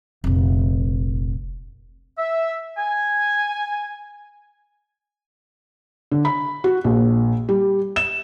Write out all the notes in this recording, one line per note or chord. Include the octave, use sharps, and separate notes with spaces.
F1 A#1
E5
G#5
D3
B5
F#4
A#1
G3
E7